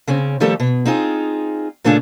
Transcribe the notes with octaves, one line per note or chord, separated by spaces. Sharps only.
C#3 C4 C#4
D#3 F3 G3 A3 G4 A4
B2
C4 D#4 F4 G#4
A#2 C#3 A3 D4 F4 G#4